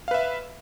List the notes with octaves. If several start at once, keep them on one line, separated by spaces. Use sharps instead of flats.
B4 E5 F5